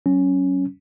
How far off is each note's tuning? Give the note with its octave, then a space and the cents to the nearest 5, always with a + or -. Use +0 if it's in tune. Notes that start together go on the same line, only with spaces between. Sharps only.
F#3 +35 C#4 +0